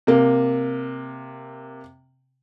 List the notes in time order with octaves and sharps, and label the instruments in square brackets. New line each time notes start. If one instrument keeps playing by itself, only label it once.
[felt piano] C3 A#3